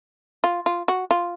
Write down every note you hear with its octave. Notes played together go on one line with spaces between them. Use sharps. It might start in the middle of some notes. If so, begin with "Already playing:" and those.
F4
F4
F#4
F4